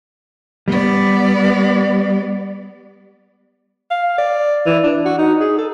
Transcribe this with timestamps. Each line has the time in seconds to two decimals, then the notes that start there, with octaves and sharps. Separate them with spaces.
0.68 G3 B3 D5
3.91 F5
4.18 D5
4.66 E3
4.83 D4
5.05 F#4
5.19 D#4
5.40 G#4
5.58 A4